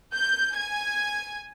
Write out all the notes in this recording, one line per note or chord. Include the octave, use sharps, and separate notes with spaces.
G6
G#5 G#6